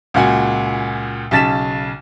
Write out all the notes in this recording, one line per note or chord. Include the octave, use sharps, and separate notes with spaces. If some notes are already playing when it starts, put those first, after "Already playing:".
C#2 A#2 F#4 G#5
B1 C#3 A5 A6 B6 E7